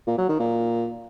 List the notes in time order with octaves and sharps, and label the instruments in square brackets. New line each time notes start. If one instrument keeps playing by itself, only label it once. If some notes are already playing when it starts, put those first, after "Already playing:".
[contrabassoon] A#2
F#3
D#3
A#2